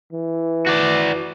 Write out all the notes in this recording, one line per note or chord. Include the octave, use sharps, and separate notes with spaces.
E3
F#4 D5